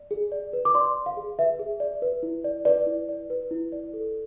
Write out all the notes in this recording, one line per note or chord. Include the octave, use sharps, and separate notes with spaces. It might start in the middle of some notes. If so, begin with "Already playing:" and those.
Already playing: D5
G#4
D5
B4
D6
D5 C6
D5
F5
G#4
B4 E5
G#4
D5
B4
E4
D5
B4 D5
E4
D5
B4
E4
D5
A4